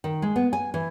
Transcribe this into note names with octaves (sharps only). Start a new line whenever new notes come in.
D#3
G#3
B3
G#5
E3